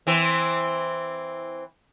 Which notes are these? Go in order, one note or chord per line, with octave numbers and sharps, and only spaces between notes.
E3 C4